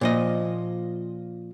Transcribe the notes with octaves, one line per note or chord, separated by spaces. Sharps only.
A#2 F3 D#5